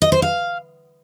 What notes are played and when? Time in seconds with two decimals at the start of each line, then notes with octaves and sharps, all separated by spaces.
0.02 D#5
0.12 C5
0.22 F5